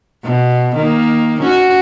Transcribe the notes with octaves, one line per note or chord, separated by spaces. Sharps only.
B2
D#3 A#3
C#4 F#4